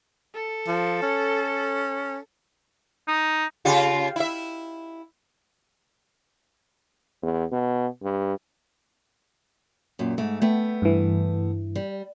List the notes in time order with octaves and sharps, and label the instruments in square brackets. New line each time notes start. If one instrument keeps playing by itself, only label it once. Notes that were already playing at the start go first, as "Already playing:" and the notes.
[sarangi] A4
[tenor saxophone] F3
C#4
[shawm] D#4
[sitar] C#3 F4 G4
E4 E5
[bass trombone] E2
B2
G2
[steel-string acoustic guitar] F#2 A#2
G#2 A3
A3 B3 G5
[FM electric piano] G2 E3
[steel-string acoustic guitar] G3